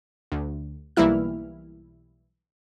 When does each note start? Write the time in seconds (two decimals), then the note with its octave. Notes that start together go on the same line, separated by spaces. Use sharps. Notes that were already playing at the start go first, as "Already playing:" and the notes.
0.32 D2
0.97 B1 E3 G3 A#3 E4 F6